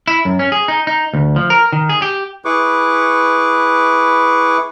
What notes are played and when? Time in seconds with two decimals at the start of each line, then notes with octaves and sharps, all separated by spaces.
0.08 E4
0.25 F#2
0.39 C#4
0.52 G#4
0.68 D#4
0.87 D#4
1.14 D2
1.36 F3
1.50 A#4
1.73 D#3
1.89 G#4
2.02 G4
2.45 E4 G#4 B4 C#6 D6